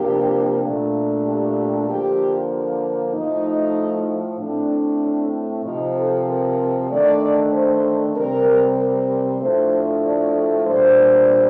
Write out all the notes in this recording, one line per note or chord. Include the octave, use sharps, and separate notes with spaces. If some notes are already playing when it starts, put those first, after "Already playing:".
Already playing: C3 F3 A#3 D4 G4
A#2 A3 D4
G4
D3 F3 A#3 G4
A2 F3 A3 D#4
A2 A3 C4 D4
C3 F3 C4 D#4
A4
A#4
D#3 A3 D4 D5
C5
C3 G3 C4 A#4
A#4
A2 F3 A3 D4 C5
D5
A#2 G3 D4 C5